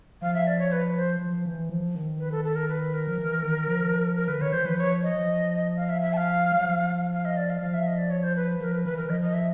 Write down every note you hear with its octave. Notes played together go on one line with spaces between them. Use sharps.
F3 F5
E5
D5
C#5
B4
C5
F3
E3
F3
D#3
B4
A4
A4
A#4
B4
A#4
F3
E3
D#3
F3
A#4
D3 B4
D#3 C#5
E3 C5
F3 B4
C#5
D#5
F3
F5
E5
E5
A5
F5
F#3
F3
F5
D#5
D5
F5
F3 F5
E5
D#5
D5
C#5
C5
B4
F3 A#4
B4
E3 B4
A#4
E3
F3 D#5
D#5
E5